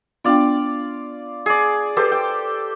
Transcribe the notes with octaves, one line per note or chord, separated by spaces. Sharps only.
B3 D4 F4 D5 F5 G5
G#4 D5
G4 A4 B4 C5
G5